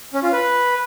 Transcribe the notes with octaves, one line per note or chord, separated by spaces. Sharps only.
C#4
F4
B4